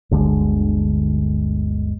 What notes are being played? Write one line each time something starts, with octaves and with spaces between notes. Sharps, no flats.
G1 D2 D3 G#3